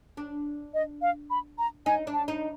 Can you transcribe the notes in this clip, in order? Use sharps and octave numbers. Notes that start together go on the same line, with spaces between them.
D4
D#5
F5
B5
A#5
D#4 G#5
D4
A5
D#4